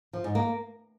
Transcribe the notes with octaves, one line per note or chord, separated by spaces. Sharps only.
F3
G#2
A#3